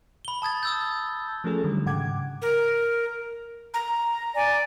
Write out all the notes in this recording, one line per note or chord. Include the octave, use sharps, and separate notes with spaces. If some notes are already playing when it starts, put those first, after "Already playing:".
B5 G7
A5 D#6 G#6 A6
D#6 E6 G6
F3 A3 C#4 G#4 A4
D3 D#3 F#3 G3
G#2 C#3 F#5 G5 D6 G#6
A#4
A#5
D5 G#5